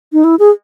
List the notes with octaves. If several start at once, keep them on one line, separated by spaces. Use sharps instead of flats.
D#4
E4
G#4